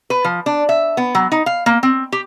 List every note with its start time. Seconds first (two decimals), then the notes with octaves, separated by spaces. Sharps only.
0.10 B4
0.25 F3
0.46 D4
0.69 E5
0.97 B3
1.15 F#3
1.32 D#4
1.46 F5
1.66 A#3
1.83 C4
2.12 G4